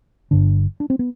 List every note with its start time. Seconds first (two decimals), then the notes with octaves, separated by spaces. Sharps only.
0.31 G1 G2 D3 D4
0.80 D4
0.90 C4
0.99 B3